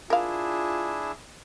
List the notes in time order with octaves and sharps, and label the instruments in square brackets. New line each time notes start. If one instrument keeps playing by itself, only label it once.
[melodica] D4 E4 G#4 [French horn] F4 [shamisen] A#4 F5